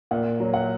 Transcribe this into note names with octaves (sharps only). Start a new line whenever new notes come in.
A#2 F#5
F#3
F#5